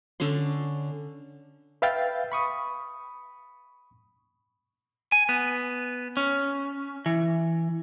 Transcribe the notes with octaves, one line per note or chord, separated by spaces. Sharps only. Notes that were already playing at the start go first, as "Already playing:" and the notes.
D3 C#4 D4 C6
B4 E5 F5 G5 A6
B5 C#6 D#6
G#5
B3
C#4
E3